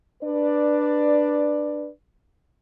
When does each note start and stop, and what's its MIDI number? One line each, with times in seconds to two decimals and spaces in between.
0.22 1.89 62
0.22 1.89 71
0.22 1.89 74